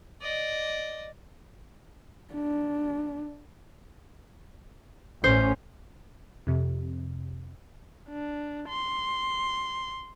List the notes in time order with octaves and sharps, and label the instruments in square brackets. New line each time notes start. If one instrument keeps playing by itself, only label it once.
[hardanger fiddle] D5 D#5
[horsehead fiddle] D4
[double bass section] A1 A2 C#4 [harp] C5
[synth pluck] F2 C3
[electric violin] D4
C6